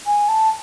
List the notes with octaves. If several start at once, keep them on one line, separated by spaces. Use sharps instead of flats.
G#5
A5